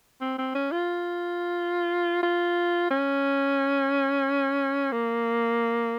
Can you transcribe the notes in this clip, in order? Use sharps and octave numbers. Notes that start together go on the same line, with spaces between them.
C4
C4
C#4
F4
F4
C#4
A#3